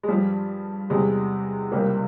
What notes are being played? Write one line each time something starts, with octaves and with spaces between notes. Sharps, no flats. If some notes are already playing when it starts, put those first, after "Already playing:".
G#3
G2 F3 G3
E2 C3 G3 G#3
C#2 C3 G3 A#3